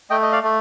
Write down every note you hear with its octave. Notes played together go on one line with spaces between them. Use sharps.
A3 D#5 G5
D#5
D5 F5
A3